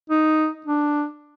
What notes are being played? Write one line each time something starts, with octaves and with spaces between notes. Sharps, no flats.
D#4
D4